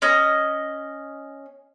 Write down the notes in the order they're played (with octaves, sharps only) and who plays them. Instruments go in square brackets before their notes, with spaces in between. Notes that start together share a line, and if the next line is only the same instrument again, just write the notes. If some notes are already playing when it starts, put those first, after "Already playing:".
[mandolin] C#4 D#5